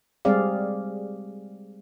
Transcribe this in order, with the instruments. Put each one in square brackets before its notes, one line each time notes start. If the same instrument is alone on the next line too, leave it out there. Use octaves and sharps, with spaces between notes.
[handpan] G3 G#3 C4 G#4 D5 F5